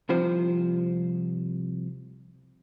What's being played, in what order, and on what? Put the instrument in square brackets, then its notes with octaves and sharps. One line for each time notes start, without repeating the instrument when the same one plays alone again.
[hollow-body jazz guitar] C2 C3 F3 C5